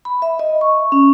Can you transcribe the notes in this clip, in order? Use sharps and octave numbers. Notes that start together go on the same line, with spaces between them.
B5
E5
D#5
C#6
C#4